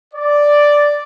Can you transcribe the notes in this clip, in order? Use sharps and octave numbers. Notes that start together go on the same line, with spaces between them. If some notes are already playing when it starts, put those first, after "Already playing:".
D5